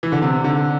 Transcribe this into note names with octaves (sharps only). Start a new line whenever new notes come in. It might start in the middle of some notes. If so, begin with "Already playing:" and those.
E3
D3
C3
D3